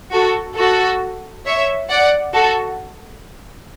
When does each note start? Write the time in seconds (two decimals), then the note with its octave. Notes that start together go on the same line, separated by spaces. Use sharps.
0.12 F#4 A4
0.57 F#4 A4
1.45 C#5 E5
1.89 D5 F#5
2.34 F#4 A4